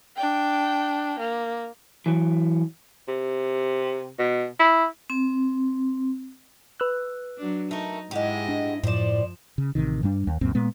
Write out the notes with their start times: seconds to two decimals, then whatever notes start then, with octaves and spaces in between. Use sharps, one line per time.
0.16 D4 G5
1.19 A#3
2.06 E3 F#3
3.08 C3
4.19 B2
4.60 E4
5.10 C4
6.80 B4 E6 F#6
7.38 F#3 D4
7.71 A3 D#4 A#4
8.11 G#2 G#3 E4 F#4 G4 D#5
8.48 D4
8.84 F#2 A2 F3 C5 D5 E7
9.58 C#3
9.75 A1 C3 D#3
10.03 G2 G3 D4
10.27 D#2
10.41 C#2 F#2 A#2 C4
10.55 A#2 G#3 B3